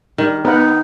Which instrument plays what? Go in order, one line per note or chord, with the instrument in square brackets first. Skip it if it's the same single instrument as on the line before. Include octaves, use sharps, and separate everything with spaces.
[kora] D#3 [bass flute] G3
[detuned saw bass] B3 [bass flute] D#4 [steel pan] A#4 B4 F#5